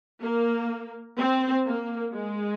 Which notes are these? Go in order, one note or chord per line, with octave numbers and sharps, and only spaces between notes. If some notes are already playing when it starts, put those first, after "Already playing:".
A#3
C4
A#3
G#3